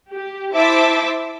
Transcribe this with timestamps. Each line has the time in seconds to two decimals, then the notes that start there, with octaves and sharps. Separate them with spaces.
0.11 G4
0.55 E4 C5 E5 A5 D6